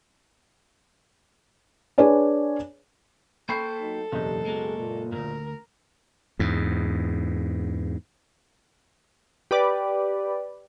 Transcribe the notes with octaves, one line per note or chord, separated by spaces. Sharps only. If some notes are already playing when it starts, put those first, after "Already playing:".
D4 G#4 B4 C#5 D5 G#5
A#3 A4 C5 G5 B5 C#6 C7
F#3 D#4
F#1 B1 E2 D4 G4 D#5
B2 G#3 A#3 G#4
A#2
D2 G#2 A#4
E2 G#2
G4 B4 D5